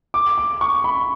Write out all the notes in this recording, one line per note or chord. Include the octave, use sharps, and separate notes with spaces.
D6
D6
C#6
B5